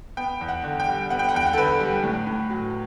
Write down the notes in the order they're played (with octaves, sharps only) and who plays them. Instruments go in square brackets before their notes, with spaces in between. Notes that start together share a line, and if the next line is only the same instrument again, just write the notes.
[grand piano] B3 G5
E2
F#5
D3
G5
G3
B3 F#5
G5
F#5
E2 G5
F#5
A4
D3 B4
G3
A2
A2
F#3